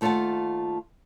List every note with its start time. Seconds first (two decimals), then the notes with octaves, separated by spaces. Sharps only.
0.01 D#2 A3 F4 D5 F#5 A5